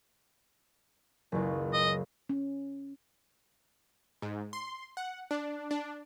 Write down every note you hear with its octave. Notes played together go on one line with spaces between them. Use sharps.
F#1 C#2
D#5
C#4
G#2
C6
F#5
D4
D4